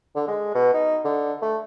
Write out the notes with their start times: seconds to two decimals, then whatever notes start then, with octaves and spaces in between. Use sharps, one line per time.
0.16 D3
0.28 G#3
0.55 B2
0.73 D#4
1.04 D3
1.42 A3